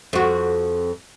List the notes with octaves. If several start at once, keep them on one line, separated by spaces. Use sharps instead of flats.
F2 F#4